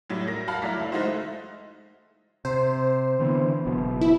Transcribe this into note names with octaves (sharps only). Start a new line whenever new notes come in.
A2 F#3 G3
A#4 A#6
F#4 F5 F#5 A5 B5 F6
F#3 A3 E4 D5 A#5 B6
F#1 E4 F5
G#3 A3 D#4 E4 F#4 C5
C3 C5
D3 E3 B3
F#1 F#2 B2
E4